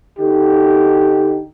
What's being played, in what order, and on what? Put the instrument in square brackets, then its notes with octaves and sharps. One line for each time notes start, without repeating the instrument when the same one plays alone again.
[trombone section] D3 D#4 G4